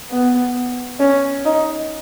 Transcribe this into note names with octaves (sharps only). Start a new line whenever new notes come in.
B3
C#4
D#4